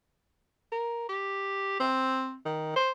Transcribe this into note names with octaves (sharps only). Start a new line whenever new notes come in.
A#4
G4
C4
D#3
C5